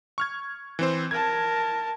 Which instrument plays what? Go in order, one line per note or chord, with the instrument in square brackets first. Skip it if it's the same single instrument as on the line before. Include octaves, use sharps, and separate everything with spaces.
[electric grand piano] C#6 F6 G#6
E3 C4 C5
[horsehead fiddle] A#4 A5 [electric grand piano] G#6